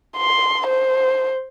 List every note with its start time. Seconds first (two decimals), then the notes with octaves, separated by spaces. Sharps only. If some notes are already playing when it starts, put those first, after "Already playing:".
0.17 C6
0.67 C5